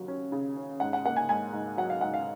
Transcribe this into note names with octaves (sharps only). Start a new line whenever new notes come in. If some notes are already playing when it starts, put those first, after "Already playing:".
Already playing: D#2 F#3
C#4
C#3
C#4
G#2 F#5
F#5
A#3 F#5
G#5
G#2 G#5
G#2
F#3 F#5
F5
G#2 F#5
F5